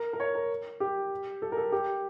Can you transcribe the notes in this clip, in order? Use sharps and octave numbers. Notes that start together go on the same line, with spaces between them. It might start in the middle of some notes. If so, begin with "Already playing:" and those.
Already playing: A#4
A#4
C#5
A#4
G4
A4
A#4
A4
G4